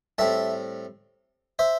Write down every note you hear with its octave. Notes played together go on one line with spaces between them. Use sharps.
A2 G3 C4 E5 A5
C5 E5